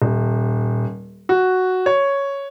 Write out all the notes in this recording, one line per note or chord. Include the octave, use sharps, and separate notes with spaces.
D#1
F#4
C#5